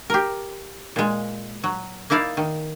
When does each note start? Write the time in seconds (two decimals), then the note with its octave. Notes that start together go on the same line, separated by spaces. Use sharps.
0.10 G4 A#4
0.96 A#2 G#3
1.64 F#3
2.10 A#3 D#4 E4 D5 F5
2.37 D#3